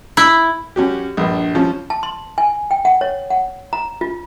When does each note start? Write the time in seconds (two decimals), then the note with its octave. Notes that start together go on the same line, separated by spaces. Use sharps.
0.17 E4
0.76 F#2 C#4 F#4 G4
1.17 A#1 G2
1.55 F3 C#4
1.90 A5
2.03 C6
2.38 G#5
2.71 G5
2.85 F#5
3.01 C#5
3.30 F#5
3.73 A#5
4.01 F4